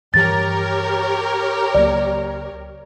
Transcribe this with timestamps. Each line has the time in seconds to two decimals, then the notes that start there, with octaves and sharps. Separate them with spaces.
0.14 G2 E3 F3 G4 A#4 C#5 A6
1.74 C#2 F#3 A#3 D5